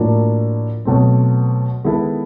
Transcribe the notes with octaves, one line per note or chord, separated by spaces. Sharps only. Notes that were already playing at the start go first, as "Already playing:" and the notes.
Already playing: A2 F3 A#3 D4 F#4
B2 F#3 A3 C4
D#3 G#3 B3 E4 A4